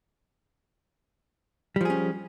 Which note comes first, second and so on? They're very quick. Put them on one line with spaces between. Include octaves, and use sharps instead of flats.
G3 F3 G#4 C#4